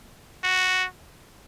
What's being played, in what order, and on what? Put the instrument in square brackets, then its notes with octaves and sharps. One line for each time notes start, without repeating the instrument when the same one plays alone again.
[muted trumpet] F#4